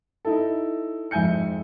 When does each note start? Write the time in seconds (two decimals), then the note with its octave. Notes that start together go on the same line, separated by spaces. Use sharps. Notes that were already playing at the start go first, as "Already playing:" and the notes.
0.25 D#4 E4 A4
1.11 F2 G#2 E5 G#5 G6 C#7